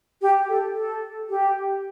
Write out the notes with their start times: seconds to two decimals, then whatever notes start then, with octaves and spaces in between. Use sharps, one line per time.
0.22 G4
0.49 A4
0.76 A4
1.30 G4